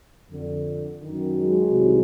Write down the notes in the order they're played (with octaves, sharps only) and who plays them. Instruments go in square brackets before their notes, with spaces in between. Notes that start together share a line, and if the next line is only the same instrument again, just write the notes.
[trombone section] F2 D3
F#2 D#3
F#3 G#3
C2 C3 D#3